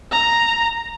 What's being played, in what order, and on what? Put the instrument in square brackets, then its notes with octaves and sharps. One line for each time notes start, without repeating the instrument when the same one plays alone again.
[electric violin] A#5